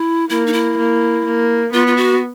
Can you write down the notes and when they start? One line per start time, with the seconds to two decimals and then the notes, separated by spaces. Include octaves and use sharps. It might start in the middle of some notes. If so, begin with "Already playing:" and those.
Already playing: E4
0.29 A#3 E4
0.46 D#4
0.53 E4
0.78 A#3
1.25 A#3
1.73 B3 F4
1.87 F4
1.97 F#4